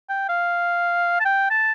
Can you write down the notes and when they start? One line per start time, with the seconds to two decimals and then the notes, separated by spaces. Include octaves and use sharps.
0.09 G5
0.29 F5
1.20 A5
1.25 G5
1.50 A5